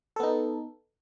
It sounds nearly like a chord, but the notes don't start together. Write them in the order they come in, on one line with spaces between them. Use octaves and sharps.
A4 B3 D#4